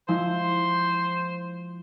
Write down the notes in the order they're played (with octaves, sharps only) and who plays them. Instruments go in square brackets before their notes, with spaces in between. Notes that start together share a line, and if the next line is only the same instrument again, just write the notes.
[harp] F3 G#3 E4 [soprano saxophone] C5